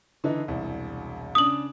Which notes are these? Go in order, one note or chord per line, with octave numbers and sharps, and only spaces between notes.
D3 E3 D#4
E1 C2
C#3 D4 D#6 F#7